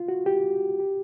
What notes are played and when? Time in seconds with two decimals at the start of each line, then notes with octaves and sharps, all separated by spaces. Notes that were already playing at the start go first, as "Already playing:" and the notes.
Already playing: F4
0.08 F#4
0.26 G4
0.80 G4